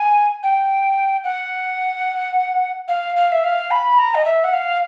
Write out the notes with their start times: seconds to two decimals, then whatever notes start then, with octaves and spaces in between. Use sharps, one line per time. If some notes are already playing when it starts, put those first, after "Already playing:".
Already playing: G#5
0.43 G5
1.24 F#5
2.88 F5
3.16 F5
3.32 E5
3.44 F5
3.71 B5
3.98 A#5
4.15 D#5
4.25 E5
4.44 F#5
4.53 F5